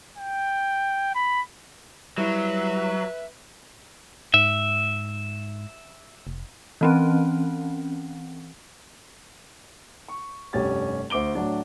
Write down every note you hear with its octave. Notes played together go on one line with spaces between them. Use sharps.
G5
B5
F#3 G3 E4 B4 E5
G#2 E5
F1
E3 C4 C#4
C#6
F1 G2 C#4 G4 A6
D2 C5 D6 D7 G7
A2 F#3 D4